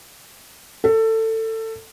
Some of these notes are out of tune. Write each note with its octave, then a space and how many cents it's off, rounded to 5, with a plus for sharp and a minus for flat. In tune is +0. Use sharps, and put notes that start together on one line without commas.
A4 +20